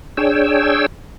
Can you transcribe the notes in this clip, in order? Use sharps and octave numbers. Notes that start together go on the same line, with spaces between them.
D4 G#4 C#5 G5 E6